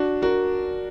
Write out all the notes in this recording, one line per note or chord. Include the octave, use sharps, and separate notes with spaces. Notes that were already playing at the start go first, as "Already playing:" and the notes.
Already playing: D4 F#4
F#4 A#4